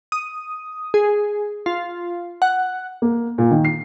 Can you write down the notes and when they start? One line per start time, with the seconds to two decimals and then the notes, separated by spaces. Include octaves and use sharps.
0.12 D#6
0.94 G#4
1.66 F4
2.42 F#5
3.02 A#3
3.38 A#2
3.51 D#3
3.65 C7